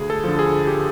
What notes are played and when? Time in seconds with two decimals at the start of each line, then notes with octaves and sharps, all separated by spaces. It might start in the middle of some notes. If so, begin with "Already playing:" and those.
Already playing: D2 G#4
0.10 A4
0.24 D3 F3
0.39 G#4
0.67 G4